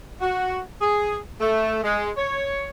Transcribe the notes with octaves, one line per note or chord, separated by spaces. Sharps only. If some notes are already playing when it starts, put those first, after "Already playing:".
F#4
G#4
A3
G#3
C#5